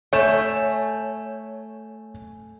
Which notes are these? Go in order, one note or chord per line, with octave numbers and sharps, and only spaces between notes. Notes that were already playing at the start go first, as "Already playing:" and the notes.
A3 C#5 G#5 G6 E7